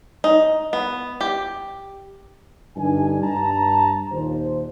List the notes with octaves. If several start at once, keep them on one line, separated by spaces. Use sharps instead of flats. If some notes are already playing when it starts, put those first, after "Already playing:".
D#4
B3
G4
G2 D3 D4 D#4 G#5
G2 A5 A#5
D#2 A#2 C5